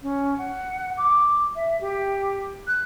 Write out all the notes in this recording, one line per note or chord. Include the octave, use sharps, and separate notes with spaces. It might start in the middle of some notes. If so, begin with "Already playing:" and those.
C#4
F#5
D6
E5
G4
F#6